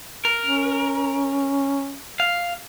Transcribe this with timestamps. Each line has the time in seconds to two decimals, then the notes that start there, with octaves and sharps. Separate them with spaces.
0.25 A#4
0.46 C#4
2.20 F5